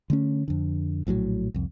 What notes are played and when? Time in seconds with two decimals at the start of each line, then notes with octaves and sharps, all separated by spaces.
0.10 D3 A3 C#4
0.48 F2 D3
1.07 A#1 A2 E3 F#3
1.54 C2 F2